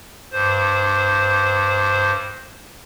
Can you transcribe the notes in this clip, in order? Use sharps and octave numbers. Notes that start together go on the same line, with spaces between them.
G2 C5